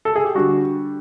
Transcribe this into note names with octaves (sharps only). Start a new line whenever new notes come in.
A4
G#4
G4
D3 G3 F#4